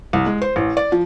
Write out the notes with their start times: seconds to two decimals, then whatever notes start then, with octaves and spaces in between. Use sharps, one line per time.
0.13 C2
0.26 G#3
0.42 C5
0.56 A1
0.77 D5
0.92 F3